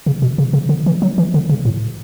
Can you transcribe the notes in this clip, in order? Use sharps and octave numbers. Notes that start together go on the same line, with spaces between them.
C#3
B2
C#3
C#3
D3
E3
F#3
E3
D3
C#3
A2